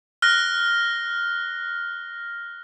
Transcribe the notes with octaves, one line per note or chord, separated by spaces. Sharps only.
F6 F#6 A#6